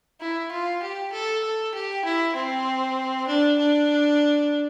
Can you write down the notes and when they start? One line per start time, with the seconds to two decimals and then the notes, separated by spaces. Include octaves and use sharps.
0.20 E4
0.51 F4
0.83 G4
1.13 A4
1.44 A4
1.75 G4
2.05 E4
2.35 C4
3.27 D4
3.59 D4